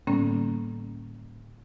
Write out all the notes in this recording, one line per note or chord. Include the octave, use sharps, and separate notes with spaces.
A2 D3 G3 A#3 B3 C#4